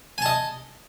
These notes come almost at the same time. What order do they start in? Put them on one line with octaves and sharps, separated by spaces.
G#5 A5 D#5